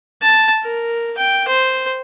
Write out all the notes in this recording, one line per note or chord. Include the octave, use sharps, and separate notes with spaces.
A5
A#4
G5
C5